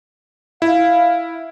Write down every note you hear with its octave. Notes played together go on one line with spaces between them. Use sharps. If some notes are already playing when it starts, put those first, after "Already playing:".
E4 F5